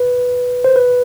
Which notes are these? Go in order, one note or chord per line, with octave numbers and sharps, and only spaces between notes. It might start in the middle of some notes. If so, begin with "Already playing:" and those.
Already playing: B4
C5
B4